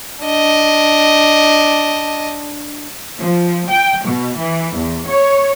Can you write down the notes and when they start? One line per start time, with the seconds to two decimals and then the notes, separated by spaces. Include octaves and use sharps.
0.24 D4 D#5
3.17 F3
3.68 G5
4.04 B2
4.36 E3
4.75 E2
5.07 C#5